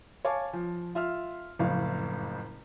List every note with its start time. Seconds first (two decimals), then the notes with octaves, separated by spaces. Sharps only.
0.25 C#5 F5 G#5 A5 C#6 D6
0.53 F3
0.95 F4 E5 F6
1.59 F#1 F2 A2 F5